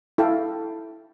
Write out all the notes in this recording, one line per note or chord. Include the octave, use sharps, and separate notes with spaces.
E4 A4 F5 G5